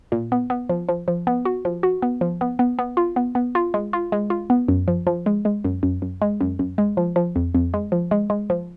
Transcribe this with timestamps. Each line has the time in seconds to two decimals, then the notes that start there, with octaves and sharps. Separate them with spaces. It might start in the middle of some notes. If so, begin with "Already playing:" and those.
0.12 A#2
0.32 B3
0.50 B3
0.69 F3
0.89 F3
1.08 F3
1.27 B3
1.45 F#4
1.65 F3
1.83 F#4
2.02 B3
2.21 F3
2.41 B3
2.59 B3
2.79 B3
2.97 F4
3.16 B3
3.35 B3
3.55 F4
3.74 G#3
3.93 F4
4.12 G#3
4.30 F4
4.50 B3
4.68 F#2
4.88 F3
5.07 F3
5.26 G#3
5.45 G#3
5.64 F#2
5.83 F#2
6.02 F#2
6.22 G#3
6.41 F#2
6.59 F#2
6.78 G#3
6.97 F3
7.16 F3
7.36 F2
7.55 F2
7.74 G#3
7.92 F3
8.11 G#3
8.30 G#3
8.50 F3